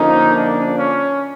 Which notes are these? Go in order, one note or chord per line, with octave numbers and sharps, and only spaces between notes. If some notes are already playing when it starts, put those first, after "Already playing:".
Already playing: D3 F3 A#3 C#4 D#4
D4
C#4